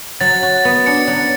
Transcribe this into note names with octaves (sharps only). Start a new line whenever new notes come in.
F#3 A6
F#4
B3
D4 C#7
F#3